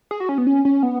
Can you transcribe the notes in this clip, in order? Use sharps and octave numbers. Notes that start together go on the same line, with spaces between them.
G#4
F#4
C#4
B3
C#4
C#4
B3